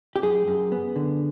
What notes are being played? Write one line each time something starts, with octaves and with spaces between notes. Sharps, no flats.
G4
F#2 G#4
F#2
B3
D3